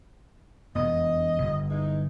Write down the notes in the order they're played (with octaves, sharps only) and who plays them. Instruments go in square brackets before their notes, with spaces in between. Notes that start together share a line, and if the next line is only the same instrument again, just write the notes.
[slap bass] E1 F2 B3 [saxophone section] D#5
[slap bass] G1
[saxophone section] E3 G#3 D#4